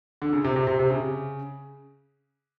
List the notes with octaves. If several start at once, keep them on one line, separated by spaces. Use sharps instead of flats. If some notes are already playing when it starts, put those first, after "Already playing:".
D3
C#3
C3
C3
C3
C3
C#3